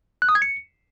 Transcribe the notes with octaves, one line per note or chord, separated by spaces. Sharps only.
F#6
D#6
G#6
C#7